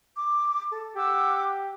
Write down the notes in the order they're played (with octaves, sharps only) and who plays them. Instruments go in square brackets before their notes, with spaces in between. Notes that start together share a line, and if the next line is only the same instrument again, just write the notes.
[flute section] D6
A4
[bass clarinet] G4 [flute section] F#5 D6 E6